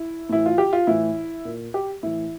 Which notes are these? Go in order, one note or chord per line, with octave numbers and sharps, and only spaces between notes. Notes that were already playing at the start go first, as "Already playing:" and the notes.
Already playing: E4
A2 E3 E4
F4
G4
F4
A2 E3 E4
A#2
G4
A2 E3 E4